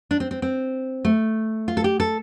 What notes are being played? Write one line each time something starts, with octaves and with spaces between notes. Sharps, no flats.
D4
C4
C4
C4
A3
F4
A4
G4
A4